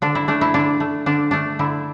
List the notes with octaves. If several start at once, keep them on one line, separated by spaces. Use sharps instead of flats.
D3 D4
E4
A3 D4
E4
D3 D4
A3
D3 D4
A3 D4
D3 E4